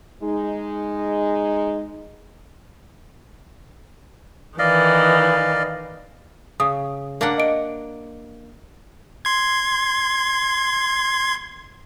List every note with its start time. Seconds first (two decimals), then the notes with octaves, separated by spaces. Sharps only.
0.23 G#3 D#4
4.59 D#3 E3 D5 D#5 F5
6.60 C#3 D#6
7.21 A#3 D4 F#5
7.38 D#5 D7
9.25 C6 G#6